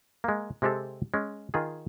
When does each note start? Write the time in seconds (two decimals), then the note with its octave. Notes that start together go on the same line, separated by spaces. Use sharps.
0.24 G#3 A#3
0.62 C3 G#3 C4 G4 A4
1.14 G#3 C#4
1.54 D#3 F4 G#4